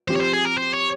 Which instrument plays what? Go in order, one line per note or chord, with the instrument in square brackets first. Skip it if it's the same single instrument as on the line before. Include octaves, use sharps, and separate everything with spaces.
[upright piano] F3 C4 G4 [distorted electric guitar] C5
[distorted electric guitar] C#5
C5
G#4
A#4
C5
C#5